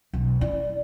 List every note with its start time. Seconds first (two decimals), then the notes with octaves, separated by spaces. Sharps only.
0.13 B1
0.41 E4 D5